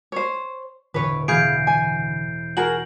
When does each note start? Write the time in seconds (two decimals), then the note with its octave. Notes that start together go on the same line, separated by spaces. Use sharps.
0.12 C5 C#5
0.94 E1 A2 D3 B4 C#5 D7 D#7
1.28 B2 E3 B3 G#4 F5 G6 C7 D7
1.67 G#5
2.57 F#4 G#4 A#4 F#7